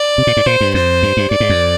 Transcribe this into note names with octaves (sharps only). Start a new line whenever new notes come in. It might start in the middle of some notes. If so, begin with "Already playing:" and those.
Already playing: D5
C3
A#2
G#2
A#2 C5
G2
F2 C5
G2
G2
G2 D5
G#2
F2